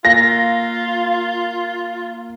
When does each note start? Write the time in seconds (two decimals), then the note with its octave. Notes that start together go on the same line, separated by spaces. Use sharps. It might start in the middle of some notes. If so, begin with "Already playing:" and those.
0.05 A#3 F4 A#6